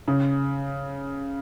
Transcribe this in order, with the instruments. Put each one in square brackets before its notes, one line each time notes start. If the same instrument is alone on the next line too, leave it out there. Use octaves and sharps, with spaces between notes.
[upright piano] C#3